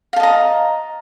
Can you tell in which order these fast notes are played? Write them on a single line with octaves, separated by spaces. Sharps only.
F5 A5 D#5 A#5